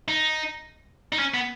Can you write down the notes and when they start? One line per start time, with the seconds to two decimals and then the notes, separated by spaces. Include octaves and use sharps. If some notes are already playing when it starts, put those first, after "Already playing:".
0.08 D#4
1.13 D#4
1.19 C#4
1.34 B3